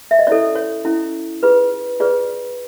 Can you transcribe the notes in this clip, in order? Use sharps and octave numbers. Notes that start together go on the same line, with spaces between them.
E5
D#5
C#4 E4 A4 D5
C#5
C#4 E4 A4
F4 G#4 B4
F4 G#4 B4 D5